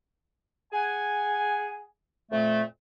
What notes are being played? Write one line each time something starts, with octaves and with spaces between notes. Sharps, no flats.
G#4 F#5 G#5
F2 A#2 A3